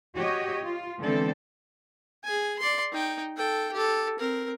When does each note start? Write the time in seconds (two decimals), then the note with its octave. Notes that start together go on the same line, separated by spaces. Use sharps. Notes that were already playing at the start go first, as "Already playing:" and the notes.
0.15 F#4 G4 C#5 D#5
0.63 F4
1.00 D3 E3 G#3 B3 C4 A4
2.24 G#4 G#5
2.59 D5 C6
2.92 D#4 G5
3.37 A4 G5
3.73 G4 A4
4.19 C4 A#4